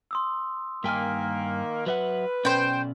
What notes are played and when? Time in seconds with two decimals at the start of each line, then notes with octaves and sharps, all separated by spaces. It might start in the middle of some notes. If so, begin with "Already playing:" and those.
0.11 C6 D#6 E6
0.84 G2 D#3 A#3 G5 G#5 F6 B6
1.86 F#3 B4 E5 F#5
2.45 B2 C#4 C5 D5 G5